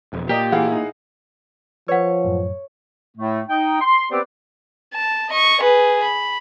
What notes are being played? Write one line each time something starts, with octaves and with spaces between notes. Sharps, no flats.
E1 F2
A#2 G4 A#4 D5 D#5
E3 G#4 F5 F#5
D#4 E4
F3 B4 C#5 F#5
F#2 A2
A2 A3
D#4 G5
C6
B3 C4 G4 B4 C5 D5
A5
D#5 C#6
G#4 B4
B5